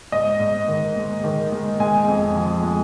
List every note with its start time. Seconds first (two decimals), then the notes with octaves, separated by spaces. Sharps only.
0.12 G#2 D#5
0.40 G#2
0.68 D#3
0.96 G#3
1.24 D#3
1.52 G#3
1.80 G#3 G#5
2.08 F2
2.36 F3
2.64 G#3